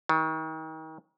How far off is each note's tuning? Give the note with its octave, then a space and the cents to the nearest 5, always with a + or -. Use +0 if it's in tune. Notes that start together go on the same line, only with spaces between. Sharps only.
D#3 +35